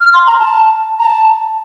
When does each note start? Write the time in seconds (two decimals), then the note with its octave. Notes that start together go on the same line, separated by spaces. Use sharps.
0.01 F6
0.13 C6
0.27 A#5
0.40 A5
0.99 A#5
1.05 A5